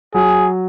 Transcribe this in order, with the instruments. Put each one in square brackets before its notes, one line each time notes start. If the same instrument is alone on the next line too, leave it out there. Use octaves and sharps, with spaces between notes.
[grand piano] F#3 [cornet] G#4